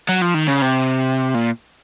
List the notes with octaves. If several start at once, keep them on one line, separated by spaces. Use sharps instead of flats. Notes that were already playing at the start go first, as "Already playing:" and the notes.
F#3
F3
D#3
C#3
C3
A#2